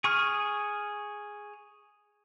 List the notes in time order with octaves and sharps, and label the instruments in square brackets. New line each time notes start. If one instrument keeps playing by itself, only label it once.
[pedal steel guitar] G#4 C#6 F6